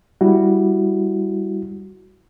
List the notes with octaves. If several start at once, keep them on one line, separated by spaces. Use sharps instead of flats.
G3 E4 F#4